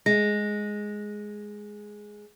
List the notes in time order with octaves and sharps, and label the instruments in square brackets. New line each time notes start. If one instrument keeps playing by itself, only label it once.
[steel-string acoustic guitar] G#3 [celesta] A#6